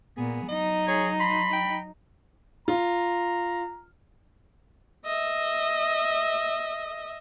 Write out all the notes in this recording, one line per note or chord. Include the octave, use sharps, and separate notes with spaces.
A#2 B3 G#4
F#3 D#4 D#5
G#4 C#5
B5 C6
G5
F4 A#5
D#5 E5